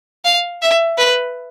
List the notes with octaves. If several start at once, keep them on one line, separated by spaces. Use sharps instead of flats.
F5
E5
B4